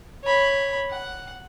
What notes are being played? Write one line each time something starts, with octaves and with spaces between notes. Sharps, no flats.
C#5 B5
F#5